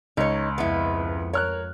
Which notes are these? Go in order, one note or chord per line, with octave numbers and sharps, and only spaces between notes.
C#2 D#4 C#5
F2 G#2 B3 E4
A#4 C#5 F6 F#6